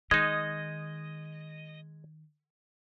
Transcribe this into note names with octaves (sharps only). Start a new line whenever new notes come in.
D#3 G#3 D#4 D#5 G#6